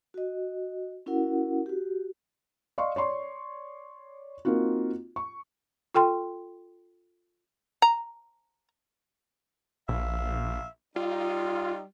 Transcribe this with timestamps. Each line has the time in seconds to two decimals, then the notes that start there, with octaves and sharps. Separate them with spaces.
0.14 F#4 D#5
1.06 C#4 E4 F#4 A#4 F#5
1.66 F#4 G4
2.78 D5 D#5 F5 C6 C#6
2.96 C#5 D5 C6 C#6
4.45 A#3 C4 D#4 F4 F#4
5.16 C#6
5.95 F4 A4 G5 C6
7.82 A#5
9.89 A#1 E5 F5
10.96 G3 D#4 F4